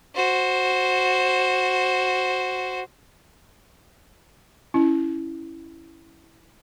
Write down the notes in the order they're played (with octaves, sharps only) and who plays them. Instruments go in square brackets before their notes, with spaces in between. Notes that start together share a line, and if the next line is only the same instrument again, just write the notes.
[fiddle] F#4 C5
[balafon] C#4 E4